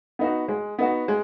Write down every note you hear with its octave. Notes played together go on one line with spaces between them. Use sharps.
B3 D#4 F#4
G#3
B3 D#4 F#4
G#3